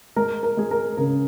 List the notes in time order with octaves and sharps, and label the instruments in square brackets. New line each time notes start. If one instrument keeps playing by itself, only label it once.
[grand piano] G#3 A#4
A#4
G#3 G#4
A#4
C#3 A#4